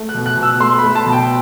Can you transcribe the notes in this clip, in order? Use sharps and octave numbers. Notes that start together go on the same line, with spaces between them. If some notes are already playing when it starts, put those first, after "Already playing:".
Already playing: A3
F#6
B2
F#6
B2
E6
A3 C6
A3 B5
A5
B2
G5